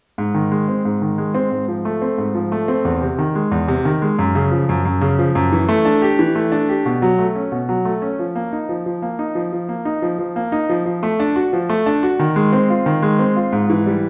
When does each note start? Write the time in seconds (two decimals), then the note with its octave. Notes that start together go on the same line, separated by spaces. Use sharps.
0.18 G#2
0.34 D#3
0.52 G#3
0.68 C4
0.85 G#2
1.02 D#3
1.18 G#3
1.34 C4
1.51 G#2
1.68 F3
1.85 A3
2.02 C4
2.18 G#2
2.35 F3
2.52 A3
2.68 C4
2.85 E2
3.02 C3
3.18 D#3
3.35 G#3
3.51 E2
3.68 C3
3.85 D#3
4.02 G#3
4.19 F#2
4.35 C#3
4.52 F3
4.69 F#2
4.85 F#2
5.01 C#3
5.19 F3
5.35 F#2
5.52 E3
5.69 A3
5.85 D4
6.02 G4
6.19 E3
6.35 A3
6.52 D4
6.69 G4
6.86 B2
7.02 F#3
7.19 A3
7.36 C#4
7.52 B2
7.69 F#3
7.85 A3
8.02 C#4
8.19 F3
8.35 A#3
8.52 D#4
8.69 F3
8.86 F3
9.02 A#3
9.19 D#4
9.35 F3
9.53 F3
9.69 A#3
9.85 D#4
10.02 F3
10.19 F3
10.36 A#3
10.52 D#4
10.69 F3
10.86 F3
11.03 A3
11.19 D4
11.36 F#4
11.53 F3
11.69 A3
11.86 D4
12.03 F#4
12.19 D#3
12.36 G#3
12.53 C4
12.70 F4
12.86 D#3
13.02 G#3
13.19 C4
13.36 F4
13.52 G#2
13.70 E3
13.86 G3